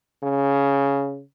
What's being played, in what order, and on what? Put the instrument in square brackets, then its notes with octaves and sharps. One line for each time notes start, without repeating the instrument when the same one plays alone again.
[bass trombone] C#3